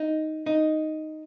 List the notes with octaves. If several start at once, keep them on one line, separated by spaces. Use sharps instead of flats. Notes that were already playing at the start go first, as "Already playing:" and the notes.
Already playing: D#4
D#4